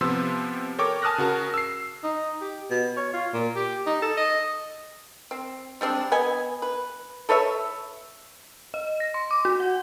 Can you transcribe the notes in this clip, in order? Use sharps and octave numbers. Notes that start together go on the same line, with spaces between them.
C3 F3 B3 C6 E6
A4 A#4 C#5 G5 C#6 D6
G#5 A5 D#6 F6 F#6 A#6
C#3 F#4 A#4 A5
E6 C7
D#4
G4
B2
C#5
F4
A#2
G4
D#4
A4
D#5
C4
G3 G#3 C4 D4
B3 D#5 G#5
B4
A4 B4 C#5 E5
D#5
A#6
C6
D6
F#4
F#5